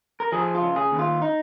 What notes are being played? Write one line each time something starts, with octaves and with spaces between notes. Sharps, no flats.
A#4
F3 G#4
F4
C#3
G#4
D#2
F4
D#4